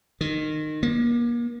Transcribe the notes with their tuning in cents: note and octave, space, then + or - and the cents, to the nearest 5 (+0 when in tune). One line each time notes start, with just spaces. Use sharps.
D#3 -20
A#3 +35